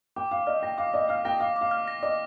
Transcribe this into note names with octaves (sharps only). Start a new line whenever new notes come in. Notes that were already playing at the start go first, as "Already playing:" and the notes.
G5 D6
F5 D6
D#5 F6
G5 A#6
F5 D6
D#5 D6
F5 F6
G5 A#6
F5 D6
F5 D6
F6
A#6
D#5 D6